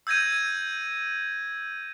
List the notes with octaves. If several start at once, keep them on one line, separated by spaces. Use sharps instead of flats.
E6 G6 G#6 A#6 D#7